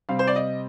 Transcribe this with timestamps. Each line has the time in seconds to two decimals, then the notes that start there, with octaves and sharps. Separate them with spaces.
0.09 C3 G3 C4 F5
0.19 C5
0.27 D5
0.36 D#5